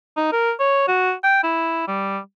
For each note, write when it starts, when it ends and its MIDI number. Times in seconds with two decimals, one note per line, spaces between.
0.17 0.32 63
0.32 0.52 70
0.60 0.87 73
0.88 1.12 66
1.24 1.39 79
1.44 1.83 64
1.88 2.19 55